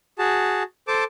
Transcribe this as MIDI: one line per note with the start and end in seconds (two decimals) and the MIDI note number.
0.19 0.63 66
0.19 0.63 68
0.19 0.63 81
0.88 1.04 69
0.88 1.04 72
0.88 1.04 81
0.88 1.04 86